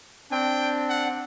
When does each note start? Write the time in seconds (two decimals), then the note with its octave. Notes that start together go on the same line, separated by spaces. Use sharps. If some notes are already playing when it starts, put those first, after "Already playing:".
0.31 C4 D4 G5
0.89 F#5